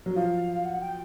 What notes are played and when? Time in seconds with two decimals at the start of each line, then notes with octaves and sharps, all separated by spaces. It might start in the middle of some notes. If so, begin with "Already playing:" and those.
0.06 F#3
0.16 F3 F5
0.65 F#5
0.81 G5